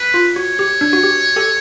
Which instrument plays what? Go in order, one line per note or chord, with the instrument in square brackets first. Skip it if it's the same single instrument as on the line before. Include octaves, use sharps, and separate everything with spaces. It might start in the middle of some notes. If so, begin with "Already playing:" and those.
Already playing: [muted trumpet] B4
[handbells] F4
[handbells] F#4 [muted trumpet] C#5
[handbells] G4
D4
F#4
G4
G4 A4